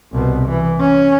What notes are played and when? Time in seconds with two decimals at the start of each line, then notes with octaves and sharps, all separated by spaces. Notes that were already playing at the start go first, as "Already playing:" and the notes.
0.12 C2 B2
0.47 E3
0.79 C#4